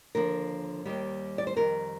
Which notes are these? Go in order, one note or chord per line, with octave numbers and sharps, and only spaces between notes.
D#2 D3 F3 A#4
D#2 D#3 G3
D5
C5
F2 D#3 G3 A#4